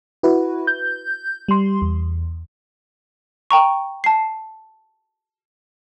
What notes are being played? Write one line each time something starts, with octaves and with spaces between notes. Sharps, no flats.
E4 F#4 B4
G6
G3 C6
E2
G5 A#5 C#6
A5 C7